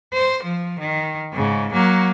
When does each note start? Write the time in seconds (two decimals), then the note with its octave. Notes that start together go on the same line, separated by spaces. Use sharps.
0.13 C5
0.44 F3
0.80 D#3
1.33 G#2 C#3
1.73 F#3 A#3